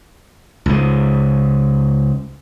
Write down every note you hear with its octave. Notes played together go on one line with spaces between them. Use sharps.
C#2 G#2